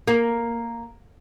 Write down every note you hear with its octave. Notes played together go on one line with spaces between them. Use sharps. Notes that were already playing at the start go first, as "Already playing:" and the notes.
A#3